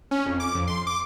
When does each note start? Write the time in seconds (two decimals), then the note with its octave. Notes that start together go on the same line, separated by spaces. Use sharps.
0.11 C#4
0.26 F2
0.40 D6
0.55 F2
0.67 C6
0.87 D6